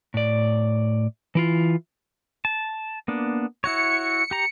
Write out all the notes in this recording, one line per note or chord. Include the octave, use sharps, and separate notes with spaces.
A2 D5
E3 E4 F4
A5
A#3 B3 D4
E4 F#4 C#5 C#7
G4 A#5